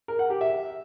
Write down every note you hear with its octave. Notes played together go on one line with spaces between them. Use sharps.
A#4
F#5
G4
E5